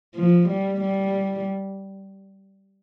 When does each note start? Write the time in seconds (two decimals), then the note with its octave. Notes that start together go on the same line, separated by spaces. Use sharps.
0.16 F3
0.48 G3
0.80 G3